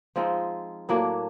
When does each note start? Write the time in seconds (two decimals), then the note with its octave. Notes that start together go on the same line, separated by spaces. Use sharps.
0.16 F3 G#3 C4 D#4
0.89 A2 F#3 A#3 D4